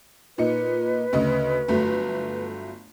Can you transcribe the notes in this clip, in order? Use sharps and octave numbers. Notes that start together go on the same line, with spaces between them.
A#2 D#4 B4 C#7
D2 C#3 D#5
G1 F#3 A3